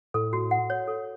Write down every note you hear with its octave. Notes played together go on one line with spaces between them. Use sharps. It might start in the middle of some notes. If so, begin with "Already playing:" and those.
A2 A4
F#4
F#5
C#5
A4